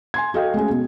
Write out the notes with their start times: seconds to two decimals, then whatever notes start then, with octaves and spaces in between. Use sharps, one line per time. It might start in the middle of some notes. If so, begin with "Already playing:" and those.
0.14 G#5 C6 G#6
0.34 F#4 A4 D#5 F5 G5
0.54 G#3 A3 C#4 G#4
0.70 B2